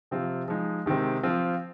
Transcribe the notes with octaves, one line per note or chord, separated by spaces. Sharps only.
C3 F3 C4 F4
F3 G#3 D#4
C3 D#3 G#3 C4
F3 C4 F4